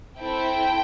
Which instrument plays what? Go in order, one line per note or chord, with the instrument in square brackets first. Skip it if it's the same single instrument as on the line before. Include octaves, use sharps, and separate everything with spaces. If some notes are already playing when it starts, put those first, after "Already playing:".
[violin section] C4 E4 A4 G5